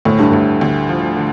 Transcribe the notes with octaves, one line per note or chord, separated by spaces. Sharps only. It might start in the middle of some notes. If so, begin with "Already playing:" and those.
D2 A2
G2
D2 A2
D2
F3
D3